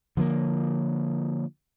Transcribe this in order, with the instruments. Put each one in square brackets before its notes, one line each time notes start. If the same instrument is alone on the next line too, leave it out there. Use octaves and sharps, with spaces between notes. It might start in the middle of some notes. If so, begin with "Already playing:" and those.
[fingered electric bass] D3 F3 A3 A#3